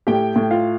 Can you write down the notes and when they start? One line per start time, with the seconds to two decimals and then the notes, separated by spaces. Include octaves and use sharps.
0.07 A2 G4 G5
0.36 A2
0.51 F4 F5